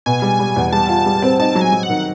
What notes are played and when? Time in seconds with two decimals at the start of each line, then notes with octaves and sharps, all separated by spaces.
0.06 B2 G#5
0.22 G3
0.39 G3
0.56 E2
0.72 G3 A5
0.89 F4
1.06 G3
1.22 C4
1.39 D#4 A5
1.55 F#3
1.61 G#5
1.72 F#3
1.83 F#5
1.89 D#3